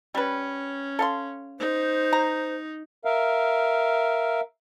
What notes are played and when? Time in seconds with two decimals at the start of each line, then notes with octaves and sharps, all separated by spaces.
0.15 G3 C#4 B4
0.99 A4 F5 C6
1.60 D#4 C5
2.13 A#5
3.05 A#4 E5 F5